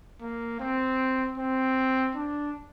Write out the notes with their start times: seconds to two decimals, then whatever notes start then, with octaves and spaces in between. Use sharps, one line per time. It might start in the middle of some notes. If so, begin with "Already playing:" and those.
0.21 A#3
0.60 C4
1.38 C4
2.15 D4